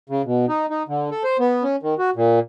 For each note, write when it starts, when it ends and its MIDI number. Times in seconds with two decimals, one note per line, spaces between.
0.10 0.22 49
0.25 0.46 47
0.49 0.66 63
0.70 0.83 63
0.88 1.10 50
1.11 1.23 69
1.24 1.37 72
1.39 1.63 59
1.63 1.76 61
1.83 1.94 51
1.98 2.10 66
2.16 2.39 46